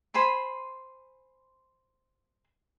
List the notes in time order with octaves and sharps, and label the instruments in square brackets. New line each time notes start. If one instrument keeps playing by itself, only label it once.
[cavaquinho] C5 G#5 B5 C6